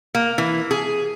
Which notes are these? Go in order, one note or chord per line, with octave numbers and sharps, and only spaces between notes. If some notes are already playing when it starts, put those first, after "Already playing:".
A#3
E3
G#4